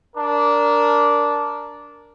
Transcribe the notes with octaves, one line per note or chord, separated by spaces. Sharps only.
D4 A#4